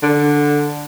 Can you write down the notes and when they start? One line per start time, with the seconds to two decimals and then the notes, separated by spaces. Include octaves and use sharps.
0.03 D3